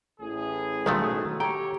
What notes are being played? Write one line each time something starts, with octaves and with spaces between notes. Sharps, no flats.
A1 A2 G#4
B1 D#3 A3 D#4 F4 F#4
G4 A4 C#5 G5 A#5